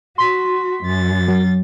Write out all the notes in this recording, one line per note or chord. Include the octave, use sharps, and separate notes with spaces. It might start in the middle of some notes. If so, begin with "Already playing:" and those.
F#4 C6 B6
F#2 A6
F#3